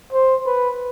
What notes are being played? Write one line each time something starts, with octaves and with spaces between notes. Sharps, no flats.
C5
B4